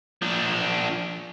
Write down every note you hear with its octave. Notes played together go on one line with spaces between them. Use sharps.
F3 D4